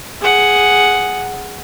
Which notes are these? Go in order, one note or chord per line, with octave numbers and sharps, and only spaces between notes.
G#4 F#5